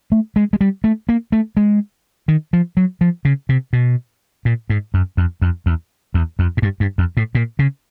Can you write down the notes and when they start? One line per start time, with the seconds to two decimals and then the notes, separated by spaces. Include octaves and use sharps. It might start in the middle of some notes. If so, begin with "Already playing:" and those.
0.12 A3
0.36 G#3
0.53 G#3
0.61 G3
0.84 A3
1.09 A#3
1.32 A3
1.57 G#3
2.28 D#3
2.53 F3
2.77 F#3
3.01 F3
3.25 C#3
3.49 C3
3.73 B2
4.45 A#2
4.70 G#2
4.94 F#2
5.17 F2
5.42 F2
5.66 E2
6.14 E2
6.39 F2
6.57 G#2
6.62 G2
6.80 G2
6.98 F2
7.17 A2
7.35 A#2
7.59 C#3